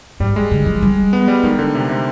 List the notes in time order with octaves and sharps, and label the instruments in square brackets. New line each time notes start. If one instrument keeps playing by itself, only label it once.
[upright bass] G#2 [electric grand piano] G3
[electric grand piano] G#3
[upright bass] D3
F3
G3
[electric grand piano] B3
G3
[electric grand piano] D#3 [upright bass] G#3
[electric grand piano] D3
C3
C3